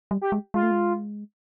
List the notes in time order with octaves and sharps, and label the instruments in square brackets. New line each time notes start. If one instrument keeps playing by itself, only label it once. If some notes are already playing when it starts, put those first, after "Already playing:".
[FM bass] G3
[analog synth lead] G4
[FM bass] G#3
[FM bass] G#3 [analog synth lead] F4
[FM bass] A3
G#3